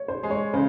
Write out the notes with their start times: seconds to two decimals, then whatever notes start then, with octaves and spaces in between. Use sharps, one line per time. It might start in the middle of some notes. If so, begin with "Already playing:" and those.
Already playing: C#5
0.08 C5
0.23 G#3
0.30 C#5
0.53 C#3 C5